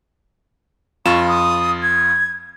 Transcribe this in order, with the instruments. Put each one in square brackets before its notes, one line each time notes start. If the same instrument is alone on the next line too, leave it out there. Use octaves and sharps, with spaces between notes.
[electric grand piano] F2 F4 E7 [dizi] C#6
[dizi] D#6
G#6